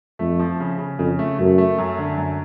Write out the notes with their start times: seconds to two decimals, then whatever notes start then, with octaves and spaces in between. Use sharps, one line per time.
0.19 F2 A3
0.39 F3
0.60 C#3
0.79 C#3
0.99 F2 C#3
1.19 A3
1.38 F#2 A3
1.58 A3
1.78 F#2
1.98 D3
2.17 F#2